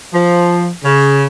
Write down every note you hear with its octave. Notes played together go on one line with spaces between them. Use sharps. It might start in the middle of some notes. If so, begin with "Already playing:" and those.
F3
C#3